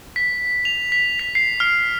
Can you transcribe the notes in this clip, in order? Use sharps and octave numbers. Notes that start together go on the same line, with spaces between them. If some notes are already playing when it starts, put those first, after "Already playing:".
B6
F7
B6
B6
C7
F6